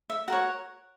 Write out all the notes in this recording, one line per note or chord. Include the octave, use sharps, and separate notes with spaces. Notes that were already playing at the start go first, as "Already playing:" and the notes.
E5
F#4 A#4 C#5 F#5